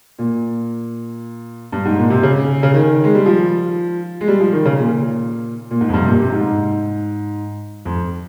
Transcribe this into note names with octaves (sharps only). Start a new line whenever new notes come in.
A#2
G2
G#2
A#2
C3
C#3
C#3
D#3
G#3
G3
F3
G#3
G3
F3
D#3
C#3
A#2
A#2
G#2
F2
G2
C3
A#2
C3
G#2
F2